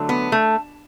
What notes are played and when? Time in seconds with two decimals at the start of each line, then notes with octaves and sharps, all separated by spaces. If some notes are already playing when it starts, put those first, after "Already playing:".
Already playing: D3 F#3 A3
0.09 B3
0.32 A3